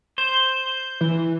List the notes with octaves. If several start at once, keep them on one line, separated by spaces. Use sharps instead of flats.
C5 G6
E3